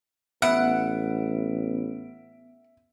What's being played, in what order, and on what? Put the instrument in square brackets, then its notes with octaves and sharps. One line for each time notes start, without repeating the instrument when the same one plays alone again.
[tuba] A1 [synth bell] B3 D7 [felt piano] E5 [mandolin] F#5